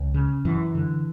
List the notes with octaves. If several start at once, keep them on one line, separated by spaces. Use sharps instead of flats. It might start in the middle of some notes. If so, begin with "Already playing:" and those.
Already playing: C#2
C#3
F#2 E3
D3